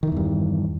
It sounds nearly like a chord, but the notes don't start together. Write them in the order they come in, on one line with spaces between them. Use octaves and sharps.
D#3 E3 E2 G2